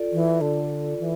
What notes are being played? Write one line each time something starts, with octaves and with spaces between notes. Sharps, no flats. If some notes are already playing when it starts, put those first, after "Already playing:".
Already playing: F4 A4 D5
E3
D3
E3